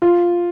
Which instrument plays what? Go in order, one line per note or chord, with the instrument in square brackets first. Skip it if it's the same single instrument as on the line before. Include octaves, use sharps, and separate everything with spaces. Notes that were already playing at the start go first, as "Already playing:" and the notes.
[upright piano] F4